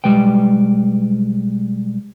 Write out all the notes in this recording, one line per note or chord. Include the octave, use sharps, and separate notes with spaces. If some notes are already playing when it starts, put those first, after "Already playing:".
B1 F#2 G3 G#3 B4 G5